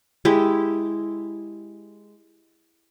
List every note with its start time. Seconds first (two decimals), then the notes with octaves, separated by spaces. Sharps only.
0.25 G#3 E4 G4